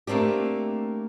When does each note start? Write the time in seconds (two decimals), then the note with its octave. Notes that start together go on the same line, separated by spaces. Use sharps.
0.07 A3 A#3 C4 D4 G4